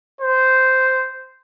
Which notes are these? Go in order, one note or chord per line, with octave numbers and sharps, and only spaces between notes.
C5